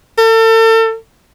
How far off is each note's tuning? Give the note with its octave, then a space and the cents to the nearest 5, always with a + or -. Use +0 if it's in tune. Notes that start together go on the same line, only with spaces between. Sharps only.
A4 +35